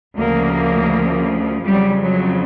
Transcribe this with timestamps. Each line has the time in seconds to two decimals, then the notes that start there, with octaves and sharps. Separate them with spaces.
0.17 D2 C#3 F3 A#3
1.65 F2 C#3 F#3 G3
2.02 F#3